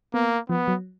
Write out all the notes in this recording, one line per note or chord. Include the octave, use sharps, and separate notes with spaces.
A#3 B3
F3 B3
F#3